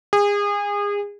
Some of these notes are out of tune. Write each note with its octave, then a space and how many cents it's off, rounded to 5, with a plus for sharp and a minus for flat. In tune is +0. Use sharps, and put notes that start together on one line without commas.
G#4 -30